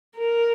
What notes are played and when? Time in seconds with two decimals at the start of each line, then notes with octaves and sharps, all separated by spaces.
0.18 A#4